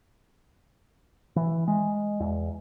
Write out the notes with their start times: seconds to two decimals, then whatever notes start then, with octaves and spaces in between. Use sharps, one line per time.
1.36 E3
1.68 G#3
2.20 E2